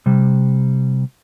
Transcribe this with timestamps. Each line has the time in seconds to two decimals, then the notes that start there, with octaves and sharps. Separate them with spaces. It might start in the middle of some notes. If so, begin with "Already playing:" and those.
0.06 C3 G3